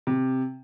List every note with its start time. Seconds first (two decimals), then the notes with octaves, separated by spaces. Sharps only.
0.07 C3